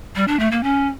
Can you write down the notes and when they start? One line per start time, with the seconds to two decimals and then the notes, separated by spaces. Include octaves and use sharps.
0.16 G3
0.28 D4
0.40 A3
0.51 A#3
0.63 C#4